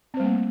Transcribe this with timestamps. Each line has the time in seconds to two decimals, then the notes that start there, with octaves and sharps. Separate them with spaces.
0.14 C4
0.17 C5
0.20 G3
0.23 A#3
0.26 A3